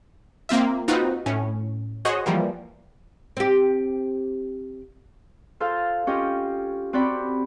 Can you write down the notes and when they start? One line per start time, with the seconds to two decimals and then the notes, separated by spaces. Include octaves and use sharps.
0.49 A#3 C4 F4 E5
0.88 C4 D#4 F4 F#4 B4
1.26 A2 C#4
2.05 F#4 G#4 C5 C#5 D#5 F#5
2.26 E3 F3 G3 A#3
3.37 C4 G4
5.60 F4 A4 C5 F5
6.07 C#4 F4 G4 D#5 G5
6.93 C4 F#4 G4 D5 G5 B5